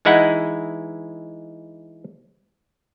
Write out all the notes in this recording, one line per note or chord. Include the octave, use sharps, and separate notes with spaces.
E3 G#3 D#4 E4 F#5